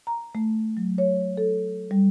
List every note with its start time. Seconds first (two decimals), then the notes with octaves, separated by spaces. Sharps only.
0.07 A#5
0.35 A3
0.77 F#3
0.98 C#5
1.37 A4
1.91 G3